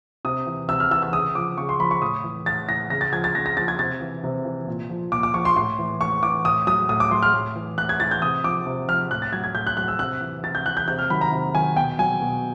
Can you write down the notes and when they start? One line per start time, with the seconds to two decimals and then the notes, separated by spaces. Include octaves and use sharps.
0.25 C3 D#6
0.47 E3
0.69 C3 E6
0.80 F6
0.91 E3 E6
1.02 E6
1.13 C#3 D#6
1.35 F3 D6
1.58 C#3 C#6
1.69 C6
1.79 F3 B5
1.91 C#6
2.02 A2 D#6
2.24 E3
2.46 A2 A6
2.69 E3 A#6
2.90 C#3 A#6
3.01 A6
3.13 F3 G#6
3.24 A6
3.35 C#3 A#6
3.46 A#6
3.57 F3 A6
3.68 G#6
3.79 C3 A6
4.01 E3
4.24 C3
4.45 E3
4.68 A#2
4.90 F3
5.12 A#2 D6
5.23 D6
5.34 F3 C#6
5.45 C6
5.56 A2 C6
5.79 E3
6.00 A2 C#6
6.23 E3 D6
6.45 A2 D#6
6.67 F#3 D#6
6.89 A2 D#6
7.00 D6
7.11 F#3 C6
7.23 F6
7.33 A2
7.56 E3
7.78 A2 F#6
7.89 G#6
8.00 E3 A6
8.11 G6
8.22 C3 D#6
8.44 F3 D6
8.66 C3
8.89 F3 F6
9.11 A2 F#6
9.22 A6
9.33 F#3 G#6
9.44 G#6
9.55 A2 G6
9.67 F#6
9.77 F#3 F#6
9.88 E6
9.99 C3 F#6
10.21 E3
10.44 C3 A6
10.55 G6
10.66 E3 F#6
10.77 G6
10.88 C3 G6
10.99 F6
11.10 D#3 F#3 B5
11.21 A#5
11.32 C3
11.54 D#3 F#3 G#5
11.76 B2 G5
11.99 F#3 G#5
12.21 B2